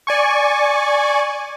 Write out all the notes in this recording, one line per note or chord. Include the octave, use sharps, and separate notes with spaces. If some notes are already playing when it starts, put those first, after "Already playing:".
D5 G#5 C#6